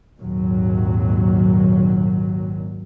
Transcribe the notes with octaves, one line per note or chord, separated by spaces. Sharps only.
G#1 D#2 A#2 F#3